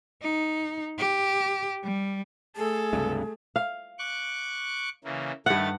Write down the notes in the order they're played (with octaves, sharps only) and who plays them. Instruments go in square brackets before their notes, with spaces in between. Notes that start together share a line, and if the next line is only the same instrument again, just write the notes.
[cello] D#4
G4
G3
[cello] A3 [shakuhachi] G#4 [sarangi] A4
[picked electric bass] C#2 G2 C3
[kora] F5
[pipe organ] C#6 D6 F#6
C#3 E3 A#3
[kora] G2 F#5 [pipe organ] D#3 A3 A6